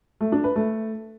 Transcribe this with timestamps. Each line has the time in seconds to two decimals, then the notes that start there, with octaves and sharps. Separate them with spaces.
0.21 A3
0.32 D4
0.44 B4
0.56 A3